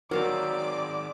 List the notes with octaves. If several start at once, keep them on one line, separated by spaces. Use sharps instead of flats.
D#3 F#3 C4 A#4 D5 F5 A5 D6